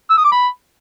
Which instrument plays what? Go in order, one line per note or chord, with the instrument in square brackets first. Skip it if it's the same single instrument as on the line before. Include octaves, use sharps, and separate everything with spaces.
[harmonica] E6
D#6
D6
B5